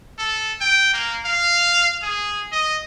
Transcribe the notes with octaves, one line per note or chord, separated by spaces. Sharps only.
A4
G5
A#3
F5
G#4
D#5